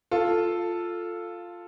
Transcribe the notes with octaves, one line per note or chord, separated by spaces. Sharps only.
F4 A4